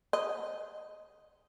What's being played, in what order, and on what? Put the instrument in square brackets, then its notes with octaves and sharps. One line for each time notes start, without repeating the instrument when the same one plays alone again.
[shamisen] D#5